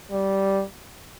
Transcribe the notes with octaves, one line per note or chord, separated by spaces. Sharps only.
G3